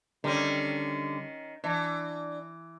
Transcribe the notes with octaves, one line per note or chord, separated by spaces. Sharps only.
D3 D#3 G3 C#4
E3 D4